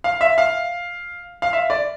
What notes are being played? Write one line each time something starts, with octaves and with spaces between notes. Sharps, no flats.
F5
E5
F5
F5
E5
D5